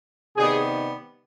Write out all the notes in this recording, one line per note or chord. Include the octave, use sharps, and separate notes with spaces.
C3 D#3 G3 B3 G#4